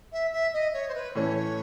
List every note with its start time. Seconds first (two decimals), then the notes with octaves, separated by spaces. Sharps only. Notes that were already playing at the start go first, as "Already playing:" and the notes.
0.12 E5
0.33 E5
0.53 D#5
0.74 C#5
0.88 C5
0.95 B4
1.15 A2 E3 A3 C#4 C#5